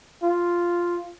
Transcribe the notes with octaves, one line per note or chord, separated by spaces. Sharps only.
F4